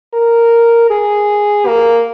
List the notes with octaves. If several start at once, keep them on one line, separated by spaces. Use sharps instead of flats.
A#4
G#4
A#3